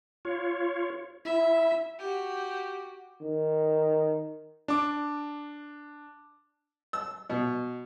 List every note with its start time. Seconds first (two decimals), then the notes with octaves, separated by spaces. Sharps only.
0.25 F4 C#5
1.25 E4 E5
1.99 F#4 G4
3.22 D#3
4.68 D4 D6
6.93 E6
7.30 B2